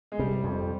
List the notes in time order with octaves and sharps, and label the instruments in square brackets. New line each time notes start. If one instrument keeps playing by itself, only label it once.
[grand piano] G#3
[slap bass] C3 [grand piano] G3
[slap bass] F2